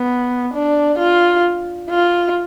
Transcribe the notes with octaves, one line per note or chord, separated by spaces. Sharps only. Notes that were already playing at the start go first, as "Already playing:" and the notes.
Already playing: B3
D4
F4
F4